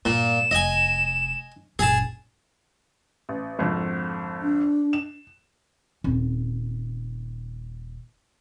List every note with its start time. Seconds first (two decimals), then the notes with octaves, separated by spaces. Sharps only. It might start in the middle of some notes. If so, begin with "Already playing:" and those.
0.05 G2 A#2 E7
0.51 F1 D#5 G#5
1.79 F#1 A#2 G#4 A5
3.29 A1
3.59 G#1 F2 D3
4.42 D4
4.93 E7
6.04 D#1 C4